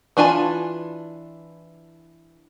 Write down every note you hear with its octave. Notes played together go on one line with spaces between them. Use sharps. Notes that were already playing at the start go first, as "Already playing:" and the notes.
E3 D4 F4 G#5 A5